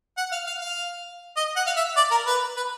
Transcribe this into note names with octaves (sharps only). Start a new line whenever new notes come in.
F#5
F5
F5
F5
D#5
F#5
F5
E5
D5
A#4
B4
B4